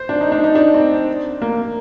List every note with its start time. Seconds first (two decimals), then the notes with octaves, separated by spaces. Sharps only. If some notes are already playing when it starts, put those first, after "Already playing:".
Already playing: C5
0.09 D4
0.21 D#4
0.32 D4
0.44 D#4
0.55 D4
0.74 C4
1.42 A#3